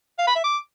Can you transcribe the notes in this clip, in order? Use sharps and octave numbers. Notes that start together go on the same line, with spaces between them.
F5
B5
E5
D6